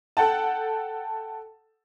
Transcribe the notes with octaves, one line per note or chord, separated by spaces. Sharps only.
A4 F#5 G5 A5